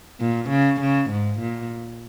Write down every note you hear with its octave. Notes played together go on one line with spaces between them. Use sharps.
A#2
C#3
C#3
G#2
A#2